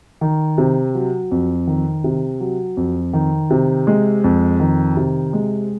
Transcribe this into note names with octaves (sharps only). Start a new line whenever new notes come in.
D#3
C3
F#3
F2
D#3
C3
F#3
F2
D#3
C3
G#3
F2
D#3
C3
G#3